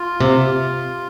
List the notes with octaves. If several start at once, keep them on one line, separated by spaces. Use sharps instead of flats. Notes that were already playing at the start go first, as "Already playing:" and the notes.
Already playing: F4
C3